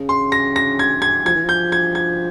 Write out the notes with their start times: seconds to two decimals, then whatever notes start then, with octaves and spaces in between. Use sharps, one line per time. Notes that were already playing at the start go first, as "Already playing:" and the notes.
Already playing: C#3
0.09 C6
0.32 A#6
0.56 A#6
0.79 G#6
1.02 G#6
1.25 F3 G#6
1.35 E3
1.44 F3 G6
1.72 G#6
1.95 G#6